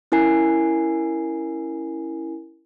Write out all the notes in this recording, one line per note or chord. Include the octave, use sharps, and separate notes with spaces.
C#4 E4 A#4 G#5 C7